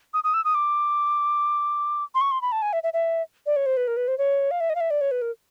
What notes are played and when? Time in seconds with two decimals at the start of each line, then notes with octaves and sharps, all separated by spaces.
0.14 D#6
0.24 D#6
0.34 E6
0.45 D#6
0.55 D6
2.15 C6
2.21 C#6
2.31 C6
2.42 B5
2.52 A5
2.62 G#5
2.73 E5
2.83 E5
2.93 E5
3.46 D5
3.56 C#5
3.66 C5
3.77 B4
3.87 A#4
3.97 B4
4.08 C5
4.18 C#5
4.51 F5
4.60 E5
4.70 D#5
4.75 F5
4.80 E5
4.90 D5
5.01 C#5
5.11 B4
5.22 A#4